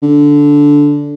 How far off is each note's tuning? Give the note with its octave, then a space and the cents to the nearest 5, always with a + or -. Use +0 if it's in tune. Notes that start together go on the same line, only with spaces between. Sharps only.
D3 -10